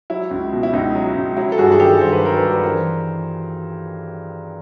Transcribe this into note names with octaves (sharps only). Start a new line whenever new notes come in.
F#3 E4
C#2
B2
E4
C#2 D#4
F#3
C#2
F#3 E4
A4
G2 F#4 G#4
G#4
D#3 G4 A4
G2 C5
B4
F#3 A#4
A4 B4
G2
B4
E3 A#4 C5